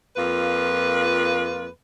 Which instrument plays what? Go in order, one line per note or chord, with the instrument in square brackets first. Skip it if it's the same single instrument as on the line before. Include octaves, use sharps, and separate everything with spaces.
[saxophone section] F2 A#3 F4 B4